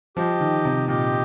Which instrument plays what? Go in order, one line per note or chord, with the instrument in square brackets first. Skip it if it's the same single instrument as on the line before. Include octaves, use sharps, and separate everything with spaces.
[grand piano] F3 [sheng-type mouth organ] G4 D#5 G5
[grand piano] D#3
C3
[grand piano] A#2 [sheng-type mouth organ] G4 D#5 G5